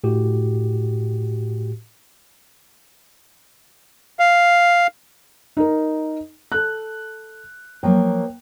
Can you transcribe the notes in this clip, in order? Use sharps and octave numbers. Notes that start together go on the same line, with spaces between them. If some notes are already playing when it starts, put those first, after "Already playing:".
A2 F#4 G4
F5
D#4 A#4
A4 F#6
F3 F#3 A#3 G5